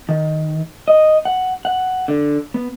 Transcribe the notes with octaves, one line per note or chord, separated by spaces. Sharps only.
D#3
D#5
F#5
F#5
D3
B3